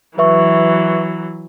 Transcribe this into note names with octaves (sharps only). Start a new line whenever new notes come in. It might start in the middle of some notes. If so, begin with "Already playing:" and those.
E3 F#3 B4 E5 C#6